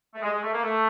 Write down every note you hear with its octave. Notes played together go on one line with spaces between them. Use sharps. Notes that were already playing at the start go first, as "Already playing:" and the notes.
A3
G#3
G#3
A3
A#3
A3